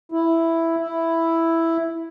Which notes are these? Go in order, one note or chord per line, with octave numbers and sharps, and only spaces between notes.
E4
E4